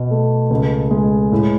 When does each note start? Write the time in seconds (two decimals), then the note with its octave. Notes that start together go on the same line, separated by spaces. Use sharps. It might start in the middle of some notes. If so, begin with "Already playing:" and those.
Already playing: B2
0.11 A3
0.50 C#2
0.91 G#3
1.32 A2